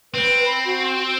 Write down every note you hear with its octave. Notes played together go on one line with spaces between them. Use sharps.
C4 B4
B5
F#4